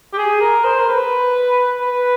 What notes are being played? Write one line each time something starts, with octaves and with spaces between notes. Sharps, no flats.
G4
G#4
A#4
C5
A#4
B4
B4